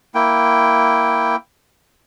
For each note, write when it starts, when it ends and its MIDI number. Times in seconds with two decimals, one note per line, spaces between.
0.15 1.36 58
0.15 1.36 64
0.15 1.36 79